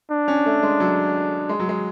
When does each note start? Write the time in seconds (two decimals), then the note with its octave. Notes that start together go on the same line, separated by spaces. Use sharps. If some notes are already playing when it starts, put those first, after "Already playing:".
0.11 D4
0.28 C#4
0.46 A3
0.63 G#3
0.80 F#3
1.49 G#3
1.60 F#3
1.69 G#3